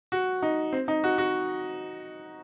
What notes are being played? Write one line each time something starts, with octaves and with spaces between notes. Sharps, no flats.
F#4
D#4
C4
D#4
F#4
F#4